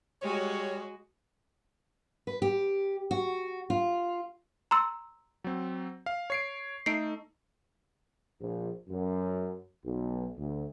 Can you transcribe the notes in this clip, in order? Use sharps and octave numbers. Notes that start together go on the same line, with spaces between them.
G3 G#3 F#4 C#5
B4
G4
F#4
F4
A#5 C6 E6
F#3 C4
F5
C#5 C7 D7
A3 D#4 A4 C7 D7
A#1
F#2
B1
D2